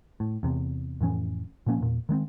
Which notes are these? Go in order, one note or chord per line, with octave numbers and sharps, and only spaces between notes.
A2
E2 C3
F2 A2 E3 C#4
A#2 F3 A#3 C#4
E2 A#2
D#3 G#3 B3 C4